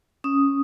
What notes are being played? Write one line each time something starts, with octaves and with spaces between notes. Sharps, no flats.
C#4 D#6